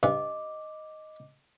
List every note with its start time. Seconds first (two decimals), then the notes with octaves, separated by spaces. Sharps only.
0.03 G2 D#5 D6